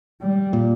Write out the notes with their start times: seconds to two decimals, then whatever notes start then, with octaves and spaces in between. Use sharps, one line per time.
0.21 G3
0.53 A#2